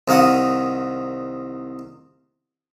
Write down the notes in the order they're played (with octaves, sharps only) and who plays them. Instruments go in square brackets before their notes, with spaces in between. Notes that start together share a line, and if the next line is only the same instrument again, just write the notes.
[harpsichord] C2 D#3 F5 F#5 D#6